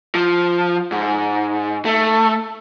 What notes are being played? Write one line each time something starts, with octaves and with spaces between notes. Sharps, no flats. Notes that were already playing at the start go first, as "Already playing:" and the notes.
F3
G#2
A3